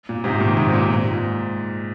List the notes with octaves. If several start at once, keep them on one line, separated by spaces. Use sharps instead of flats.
A#2
G#2 C3
A#2 D#3
G#2 C3
C3
A#2
A#2
G#2